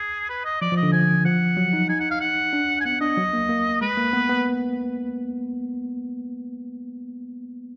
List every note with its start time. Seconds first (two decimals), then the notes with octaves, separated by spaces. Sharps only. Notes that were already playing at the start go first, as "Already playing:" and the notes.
Already playing: G#4
0.29 B4
0.45 D#5
0.61 F3 D5
0.72 F3
0.77 D#5
0.83 D3
0.93 F3 G#5
1.25 F3 F#5
1.57 F#3
1.73 D#4
1.89 D#4 G#5
2.00 F#5
2.11 F5
2.21 F#5
2.53 D4
2.81 G#5
2.85 B3 F#5
3.01 D4 D#5
3.17 F#3
3.33 A#3
3.49 A#3
3.81 G#3 B4
3.97 A#3
4.13 B3
4.29 B3